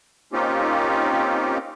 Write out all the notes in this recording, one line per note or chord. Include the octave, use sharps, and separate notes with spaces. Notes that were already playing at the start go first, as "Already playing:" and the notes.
A#3 C4 C#4 D#4 F4 G4